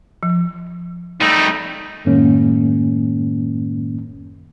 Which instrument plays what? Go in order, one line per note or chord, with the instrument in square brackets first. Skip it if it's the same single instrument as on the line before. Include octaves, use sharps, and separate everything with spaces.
[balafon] F3
[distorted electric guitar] G3 A3 [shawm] D#4
[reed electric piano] F#2 A2 D#3 G#3 A#3 C#4